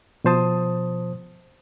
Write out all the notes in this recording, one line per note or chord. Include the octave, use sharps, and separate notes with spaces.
B2 F3 C5 A5 D#6